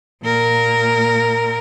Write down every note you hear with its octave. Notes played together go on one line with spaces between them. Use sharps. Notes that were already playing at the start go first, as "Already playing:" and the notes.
A#2 A#4